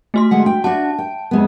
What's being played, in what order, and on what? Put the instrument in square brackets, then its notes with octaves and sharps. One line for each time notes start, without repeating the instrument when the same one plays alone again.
[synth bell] A3 F#4 C6
[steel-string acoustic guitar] D3 G#3 F#5
G5
[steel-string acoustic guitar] D4 F#4 [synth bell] A5
[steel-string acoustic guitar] G5
F2 G#3 B3